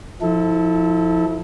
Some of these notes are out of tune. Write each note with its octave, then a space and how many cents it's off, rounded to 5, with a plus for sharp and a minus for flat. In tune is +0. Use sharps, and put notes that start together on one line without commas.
F3 +0 E4 -35 A4 +0